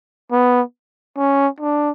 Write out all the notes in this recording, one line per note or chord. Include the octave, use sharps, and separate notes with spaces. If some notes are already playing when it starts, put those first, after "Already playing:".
B3
C#4
D4